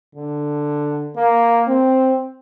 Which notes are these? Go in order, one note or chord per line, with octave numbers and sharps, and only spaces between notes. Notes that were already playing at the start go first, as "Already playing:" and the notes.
D3
A#3
C4